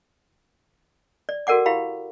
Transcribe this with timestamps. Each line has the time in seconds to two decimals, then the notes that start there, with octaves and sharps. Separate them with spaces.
1.29 D5
1.47 F#4 A4 A#4 D5 F#5 D6
1.66 E4 G4 F5 B5